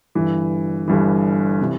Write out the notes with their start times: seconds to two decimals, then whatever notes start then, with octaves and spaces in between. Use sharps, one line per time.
0.15 G1 G2 E3
0.88 G1 G2 E3
1.61 C3 E3